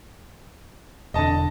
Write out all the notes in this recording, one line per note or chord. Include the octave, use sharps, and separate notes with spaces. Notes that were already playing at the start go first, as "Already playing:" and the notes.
E1 D3 D#5 A5